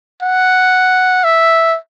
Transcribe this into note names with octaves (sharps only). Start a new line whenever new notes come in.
F#5
E5